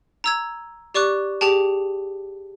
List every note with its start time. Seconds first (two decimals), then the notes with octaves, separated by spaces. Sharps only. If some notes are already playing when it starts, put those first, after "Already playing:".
0.24 A#5 E6 G#6
0.94 G4 D5 C#6 D6 F#6
1.41 G4 G#4 G5 A5